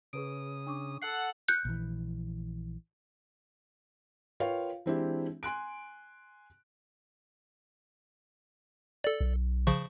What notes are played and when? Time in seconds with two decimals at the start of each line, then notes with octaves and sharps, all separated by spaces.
0.13 C#3 G#4 B4 D#6 D7
0.67 D4 C#6 D6
1.02 A4 F#5 C7
1.48 F#6 G6 C#7
1.65 A#1 E3
4.40 F4 A#4 B4 C#5 F5 G5
4.86 E3 G#3 C4 D4 E4 G4
5.43 G#5 C6 F#6 D7
9.04 A4 D5
9.21 B1
9.67 C#3 F3 C#6